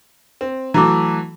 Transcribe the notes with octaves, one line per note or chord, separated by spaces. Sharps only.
C4
E3 F#3 A3 A#5 D6